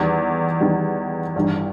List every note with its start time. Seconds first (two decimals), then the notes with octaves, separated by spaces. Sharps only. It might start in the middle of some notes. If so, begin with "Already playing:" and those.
Already playing: E2 D#3 G3
0.60 E2 D#3 G3
1.36 A1 G2 D#3 G3